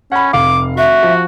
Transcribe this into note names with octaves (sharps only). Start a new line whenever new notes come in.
C#4 F#5 B5
F1 F5 D6
F#4 E5
F3